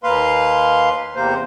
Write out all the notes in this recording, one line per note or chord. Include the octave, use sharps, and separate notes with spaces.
D#2 A#3 B4 F5 C6
E2 C3 A#3 C5